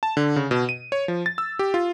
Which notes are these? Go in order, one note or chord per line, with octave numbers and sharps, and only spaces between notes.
A5
D3
C#3
B2
D#7
C#5
F3
A6
E6
G4
F4